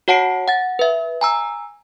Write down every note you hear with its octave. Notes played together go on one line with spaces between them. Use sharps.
F#4 C#5 F#5 A5 C7 D7
F#5 A6
B4 E5
G#5 A#5 E6